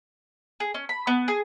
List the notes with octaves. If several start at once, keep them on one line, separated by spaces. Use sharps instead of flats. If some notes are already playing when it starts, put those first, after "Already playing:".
G#4
C#4
B5
B3
G#4